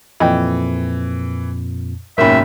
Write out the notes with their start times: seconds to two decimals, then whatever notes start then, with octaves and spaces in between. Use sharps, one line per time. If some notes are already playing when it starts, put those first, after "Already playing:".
0.20 F2 A#2 E3 D#5 G5
2.18 F#1 D#2 G#2 B2 C#4 A#4 E5 B5